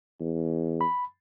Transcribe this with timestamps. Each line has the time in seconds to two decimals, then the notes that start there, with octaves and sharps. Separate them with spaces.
0.20 E2
0.81 B5